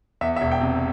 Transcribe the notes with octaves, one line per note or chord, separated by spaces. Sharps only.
E2 E5
E5
E1
G5
C3